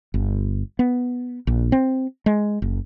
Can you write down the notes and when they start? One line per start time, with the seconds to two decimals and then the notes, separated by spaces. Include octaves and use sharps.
0.14 G1
0.79 B3
1.47 A#1
1.72 C4
2.26 G#3
2.62 F#1